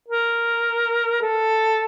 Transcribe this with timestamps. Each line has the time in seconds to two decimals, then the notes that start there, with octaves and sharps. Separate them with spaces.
0.08 A#4
1.22 A4